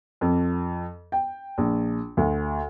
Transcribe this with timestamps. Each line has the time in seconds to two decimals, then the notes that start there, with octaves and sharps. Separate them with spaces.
0.21 F2
1.12 G5
1.58 A#1
2.17 D2